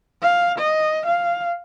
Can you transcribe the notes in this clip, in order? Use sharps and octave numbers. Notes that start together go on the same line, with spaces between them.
F5
D#5
F5